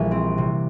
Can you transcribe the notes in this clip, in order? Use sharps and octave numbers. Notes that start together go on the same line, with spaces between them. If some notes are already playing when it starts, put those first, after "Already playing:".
Already playing: A#1 E3 G3
C4
C3